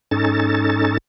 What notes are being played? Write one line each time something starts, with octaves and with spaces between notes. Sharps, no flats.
G#2 C#4 D#4 A4 A6